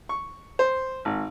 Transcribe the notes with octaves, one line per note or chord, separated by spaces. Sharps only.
C#6
C5
G#1